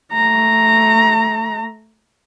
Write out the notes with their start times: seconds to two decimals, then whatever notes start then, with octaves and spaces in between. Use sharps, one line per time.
0.13 A3 A#5